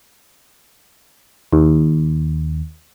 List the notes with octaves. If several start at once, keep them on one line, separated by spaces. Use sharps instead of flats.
D#2